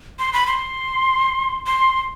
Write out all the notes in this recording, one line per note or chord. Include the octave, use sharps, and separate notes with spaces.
C6
B5
C6
C6